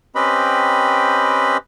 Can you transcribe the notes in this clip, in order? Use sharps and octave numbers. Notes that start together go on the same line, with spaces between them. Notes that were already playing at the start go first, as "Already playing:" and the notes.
C4 C#4 G4 B4 D#5 B5